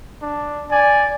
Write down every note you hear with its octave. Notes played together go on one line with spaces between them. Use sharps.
D4
D5 G#5